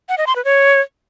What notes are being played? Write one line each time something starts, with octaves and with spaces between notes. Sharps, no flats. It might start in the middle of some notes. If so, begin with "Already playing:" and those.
F#5
D#5
C6
B4
C#5